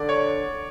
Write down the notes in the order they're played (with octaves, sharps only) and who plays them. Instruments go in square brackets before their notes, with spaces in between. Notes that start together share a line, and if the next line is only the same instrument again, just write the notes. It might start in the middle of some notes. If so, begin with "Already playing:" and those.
Already playing: [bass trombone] D3 [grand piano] D5
[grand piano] C#5